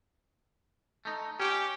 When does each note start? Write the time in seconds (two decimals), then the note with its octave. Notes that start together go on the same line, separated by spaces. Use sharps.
1.05 A3 D#4
1.40 C#4 G4